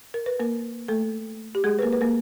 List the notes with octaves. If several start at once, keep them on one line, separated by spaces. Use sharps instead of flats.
A#4
B4
A#3 A#4
A3 A4
G4
G#3 G#4
B4
A#3 A#4
B4
A#3 A#4